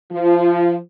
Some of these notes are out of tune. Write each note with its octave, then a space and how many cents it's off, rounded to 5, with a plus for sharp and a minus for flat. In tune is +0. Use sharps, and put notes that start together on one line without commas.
F3 -10 F4 -35